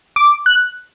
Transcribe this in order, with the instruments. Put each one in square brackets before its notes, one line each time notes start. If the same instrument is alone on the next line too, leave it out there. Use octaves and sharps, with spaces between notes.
[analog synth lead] D6
F#6